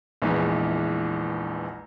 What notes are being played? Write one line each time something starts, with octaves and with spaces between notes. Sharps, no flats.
A#1 E2 E3 G#3 D#4 B4